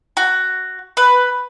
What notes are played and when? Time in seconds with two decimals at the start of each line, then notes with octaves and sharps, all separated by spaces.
0.17 F#4
0.97 B4